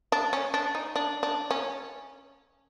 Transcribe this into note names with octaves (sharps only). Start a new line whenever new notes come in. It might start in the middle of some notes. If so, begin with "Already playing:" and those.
D4
C#4
D4
D#4
D4
D4
C#4